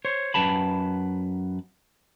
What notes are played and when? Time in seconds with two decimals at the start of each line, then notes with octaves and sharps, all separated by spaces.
0.05 C5 C#5
0.34 F#2 B4 A5 B5